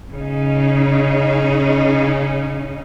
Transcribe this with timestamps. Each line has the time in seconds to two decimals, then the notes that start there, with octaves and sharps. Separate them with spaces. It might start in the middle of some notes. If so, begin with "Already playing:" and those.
0.12 C#3 D#4